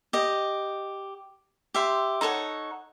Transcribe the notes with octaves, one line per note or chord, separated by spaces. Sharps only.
G4 D#5
G4 E5 C6
D#4 A4 C#5 F#5